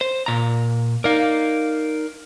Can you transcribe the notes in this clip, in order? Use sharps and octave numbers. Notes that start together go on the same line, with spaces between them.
C5
A#2 A#5
D#4 A#4 D5 F5